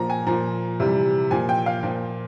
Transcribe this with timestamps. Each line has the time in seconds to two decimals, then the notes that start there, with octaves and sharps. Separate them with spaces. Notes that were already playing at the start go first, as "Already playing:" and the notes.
Already playing: A#2 F3 A#5
0.10 G#5
0.27 A#2 F3 A#5
0.80 C3 E3 G3
1.31 A#2 F3 G#5
1.49 G5
1.66 F5
1.83 A#2 F3